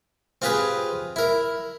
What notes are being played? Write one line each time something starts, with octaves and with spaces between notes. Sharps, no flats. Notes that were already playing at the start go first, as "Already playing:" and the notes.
C4 F4 G4 G#4 B4
E4 A#4